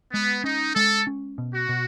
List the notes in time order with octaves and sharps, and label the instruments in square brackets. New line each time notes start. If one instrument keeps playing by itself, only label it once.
[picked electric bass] G#3 [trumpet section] B3
[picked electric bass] C#4 [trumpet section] D#4
[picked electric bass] G#3 [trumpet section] A4
[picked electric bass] C#4
B2
[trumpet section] F#4
[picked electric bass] B2